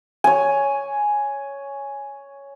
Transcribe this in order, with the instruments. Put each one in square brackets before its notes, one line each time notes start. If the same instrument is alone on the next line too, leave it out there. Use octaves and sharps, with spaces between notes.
[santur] C#5 G#5